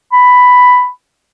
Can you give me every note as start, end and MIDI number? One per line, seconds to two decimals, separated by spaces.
0.13 0.89 83